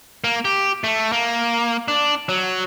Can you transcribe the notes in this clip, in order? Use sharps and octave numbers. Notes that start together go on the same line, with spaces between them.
A#3
G4
A3
A#3
D4
F#3